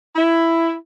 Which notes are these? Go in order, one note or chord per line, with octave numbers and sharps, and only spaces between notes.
E4